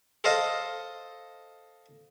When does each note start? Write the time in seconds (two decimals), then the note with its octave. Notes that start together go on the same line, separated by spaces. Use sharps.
0.24 A4 C5 D#5 F5